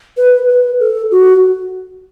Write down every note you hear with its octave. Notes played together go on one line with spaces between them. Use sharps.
B4
B4
A4
F#4